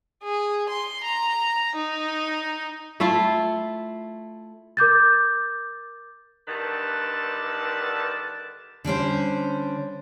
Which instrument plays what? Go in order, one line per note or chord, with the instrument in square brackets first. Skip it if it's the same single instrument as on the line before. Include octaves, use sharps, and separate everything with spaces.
[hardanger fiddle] G#4
C6
A#5
D#4
[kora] A3 E4 F4
[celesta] A#4 D6 G6 A6
[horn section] G2 D3 D#3 B4 A5
[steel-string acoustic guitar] D3 G3 C#4 C5